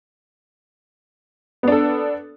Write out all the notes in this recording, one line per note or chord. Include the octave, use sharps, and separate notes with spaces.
B3 D4 A4